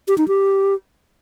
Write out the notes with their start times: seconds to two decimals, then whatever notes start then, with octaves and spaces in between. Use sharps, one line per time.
0.08 G4
0.18 D#4
0.28 G4